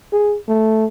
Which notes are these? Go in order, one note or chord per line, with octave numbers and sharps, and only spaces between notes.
G#4
A3